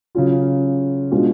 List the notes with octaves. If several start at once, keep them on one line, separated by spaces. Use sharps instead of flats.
C#3 F#3 C#4 F4
B2 G#3 D4 F4